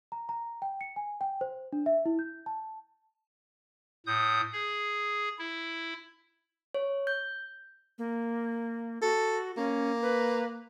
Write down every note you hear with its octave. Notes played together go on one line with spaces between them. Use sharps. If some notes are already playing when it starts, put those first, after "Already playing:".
A#5
A#5
G5
C#7
G#5
G5
C5
D4
E5
E4
G6
A5
A2 D#6 G6
G#4
E4
C#5
G6
A#3
F#4 A4
A#3 C#4
B4